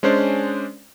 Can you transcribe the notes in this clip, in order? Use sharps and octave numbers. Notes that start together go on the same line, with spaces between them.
G#3 C#4 D4 C5 D5